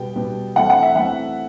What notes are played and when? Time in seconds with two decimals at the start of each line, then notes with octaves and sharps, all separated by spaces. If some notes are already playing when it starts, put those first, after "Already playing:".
Already playing: B2 G3 B3 G5
0.16 B2 G3 B3
0.56 E3 A3 C4 F#5
0.70 F#5
0.83 E5
0.95 E3 A3 C4 F#5